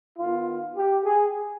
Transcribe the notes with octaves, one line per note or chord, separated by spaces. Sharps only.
D#3 B3 F4
G4
G#4